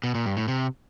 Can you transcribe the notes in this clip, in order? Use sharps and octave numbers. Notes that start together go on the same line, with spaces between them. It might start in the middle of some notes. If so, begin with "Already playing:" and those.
B2
A#2
G2
A2
C3